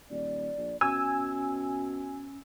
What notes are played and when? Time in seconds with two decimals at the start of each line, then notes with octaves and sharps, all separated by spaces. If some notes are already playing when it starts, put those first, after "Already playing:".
0.10 D#1 D5
0.58 A#1
0.81 B2 C#4 G#5 E6